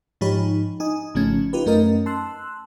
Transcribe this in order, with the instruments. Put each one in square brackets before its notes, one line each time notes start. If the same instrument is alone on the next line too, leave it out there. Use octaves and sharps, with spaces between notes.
[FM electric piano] G#2 F3 D#4 G4 C#5 B5
D#4 G#5 D#6
G#1 C#3 F3 A3 C#4 G#6
D#4 F4 G4 B4
F#2 A3 C#4 D#4 A#4 D#5
A5 C6 E6 F#6